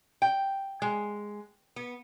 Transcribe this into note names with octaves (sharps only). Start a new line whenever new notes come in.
G5
G#3
B3